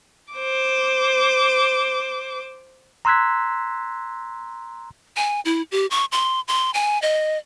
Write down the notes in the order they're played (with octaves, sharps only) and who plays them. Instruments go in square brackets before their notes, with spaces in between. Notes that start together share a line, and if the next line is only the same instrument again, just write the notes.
[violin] C5 D6
[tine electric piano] A#5 C6 E6 F#6 G#6 B6
[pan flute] G#5
E4
G4
C#6
C6
C6
G#5
D#5